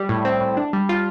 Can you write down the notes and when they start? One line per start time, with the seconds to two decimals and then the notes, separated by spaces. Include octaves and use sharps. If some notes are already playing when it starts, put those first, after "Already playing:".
Already playing: G3
0.09 A2
0.25 C4
0.41 A2
0.57 D4
0.73 G3
0.89 F4